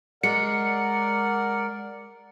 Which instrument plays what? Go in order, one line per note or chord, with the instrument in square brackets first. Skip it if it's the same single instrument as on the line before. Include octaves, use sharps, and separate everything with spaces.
[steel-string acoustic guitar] G#3 [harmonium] A#4 D5 F#5 [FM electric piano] C#7